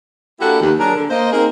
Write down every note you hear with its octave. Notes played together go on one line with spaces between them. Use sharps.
A#3 D4 E4 F#4 G4 A4
D#2
F#3 D4 G#4 A#4
D3
A#3 C5 D#5
A#3 C4 D#4 G#4 A#4